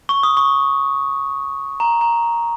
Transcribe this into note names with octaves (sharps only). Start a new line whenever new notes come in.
C#6
D#6
C#6
A#5
A#5